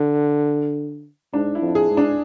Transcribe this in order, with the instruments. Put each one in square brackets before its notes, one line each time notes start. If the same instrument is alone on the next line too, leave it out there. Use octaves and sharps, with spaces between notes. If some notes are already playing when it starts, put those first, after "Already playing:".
Already playing: [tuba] D3
[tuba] G#2 [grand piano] D4
[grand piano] E4
[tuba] F2
[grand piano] G#4
[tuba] G#2
[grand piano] D4